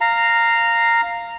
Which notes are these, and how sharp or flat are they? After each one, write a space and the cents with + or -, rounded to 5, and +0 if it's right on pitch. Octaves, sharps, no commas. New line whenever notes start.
F5 +0 A#5 -10